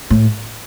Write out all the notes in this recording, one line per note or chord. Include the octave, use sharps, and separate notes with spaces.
A2